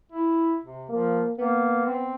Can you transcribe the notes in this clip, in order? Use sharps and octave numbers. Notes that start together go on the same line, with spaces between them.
E4
C3
F3 A#3
A#3 B3
C4